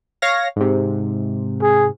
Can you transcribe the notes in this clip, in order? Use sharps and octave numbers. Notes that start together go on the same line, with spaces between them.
C#5 F5 A#6
G#2 C3
G#4